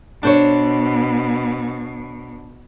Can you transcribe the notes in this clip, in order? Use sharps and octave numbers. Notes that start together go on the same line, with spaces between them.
B2 D4 C5 C#5